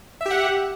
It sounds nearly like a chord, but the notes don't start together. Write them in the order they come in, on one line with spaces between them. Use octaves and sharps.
E5 G4 F#5